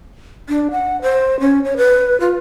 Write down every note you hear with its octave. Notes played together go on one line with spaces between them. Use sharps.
D4
F#5
C5
C#4
C#5
B4
F4